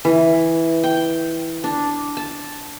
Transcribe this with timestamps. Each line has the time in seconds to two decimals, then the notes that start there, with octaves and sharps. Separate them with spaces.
0.05 E3
0.84 G5
1.64 D4
2.17 A5